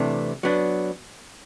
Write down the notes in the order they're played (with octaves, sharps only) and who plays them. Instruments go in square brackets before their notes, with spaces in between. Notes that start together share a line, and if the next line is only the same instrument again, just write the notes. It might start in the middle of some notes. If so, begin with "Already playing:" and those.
Already playing: [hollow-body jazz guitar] C3 E3 A3 D4
F#3 B3 D4